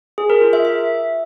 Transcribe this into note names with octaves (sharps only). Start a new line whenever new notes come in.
G#4
A#4
F4
E5
E5